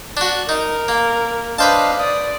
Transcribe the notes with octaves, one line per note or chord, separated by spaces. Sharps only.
D4 F#4
D#4 A#4
A#3
D4 B4 C5 D#5 F5 A5
D5 D#6